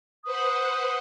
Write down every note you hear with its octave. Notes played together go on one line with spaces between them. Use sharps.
B4 C5 F#5 D#6